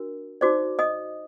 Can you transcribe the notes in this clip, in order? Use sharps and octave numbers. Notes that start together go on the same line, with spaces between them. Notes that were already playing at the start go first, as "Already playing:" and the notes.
Already playing: D4 F#4 A#4
D#4 F#4 C5 D5 D6
D#5 D#6